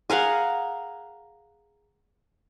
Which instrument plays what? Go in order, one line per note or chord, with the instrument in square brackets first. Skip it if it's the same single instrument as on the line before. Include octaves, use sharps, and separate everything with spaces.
[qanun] G#4 A#4 F5 F#5